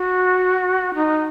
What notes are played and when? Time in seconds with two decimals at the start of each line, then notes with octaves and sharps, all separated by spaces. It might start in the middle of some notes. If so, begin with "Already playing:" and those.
Already playing: F#4
0.94 D#4